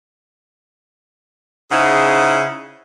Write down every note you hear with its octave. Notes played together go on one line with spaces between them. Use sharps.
C#3 D#4 E4 G#4 C5 F#5